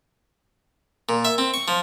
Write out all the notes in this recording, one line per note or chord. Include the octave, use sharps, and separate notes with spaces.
A#2
E5
C4
C#6
F3